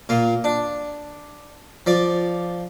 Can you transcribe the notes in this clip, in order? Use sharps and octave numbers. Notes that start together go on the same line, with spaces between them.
A#2 F4
D4
F3 D5